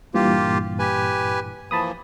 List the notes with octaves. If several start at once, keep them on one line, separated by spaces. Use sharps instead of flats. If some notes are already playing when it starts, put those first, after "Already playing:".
G2 A#2 E3 A#3 F4 G4
G4 B4 G#5
E3 F3 A#3 A5 B5 D#6